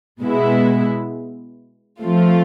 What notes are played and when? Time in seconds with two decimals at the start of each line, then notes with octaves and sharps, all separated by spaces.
0.21 B2 G#3 B3 E4
2.01 F3 A3 C4 F4